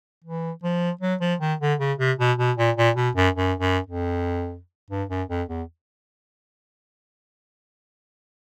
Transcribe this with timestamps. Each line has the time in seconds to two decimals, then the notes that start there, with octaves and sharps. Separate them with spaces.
0.24 E3
0.63 F3
1.01 F#3
1.21 F3
1.40 D#3
1.60 D3
1.79 C#3
1.98 C3
2.19 B2
2.38 B2
2.57 A#2
2.77 A#2
2.96 B2
3.15 F#2
3.35 F#2
3.60 F#2
3.86 F2
4.90 G2
5.09 F#2
5.29 F2
5.49 E2